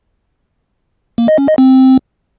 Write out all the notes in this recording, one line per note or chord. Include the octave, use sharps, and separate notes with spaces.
A#3
D#5
C#4
D#5
C4